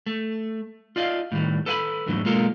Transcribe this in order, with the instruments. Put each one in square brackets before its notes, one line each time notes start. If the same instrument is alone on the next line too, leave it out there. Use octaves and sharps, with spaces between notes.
[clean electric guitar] A3
F4 D5 D#5 F5
A2 D#3 G3
A4 B4 D5 F5 G#5 B5
E2 G#2 D3 E3 F#3 A3
B1 G#3 A#3 F4 A4 A#4